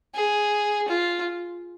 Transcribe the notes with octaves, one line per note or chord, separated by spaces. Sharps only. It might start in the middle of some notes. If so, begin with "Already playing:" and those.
G#4
F4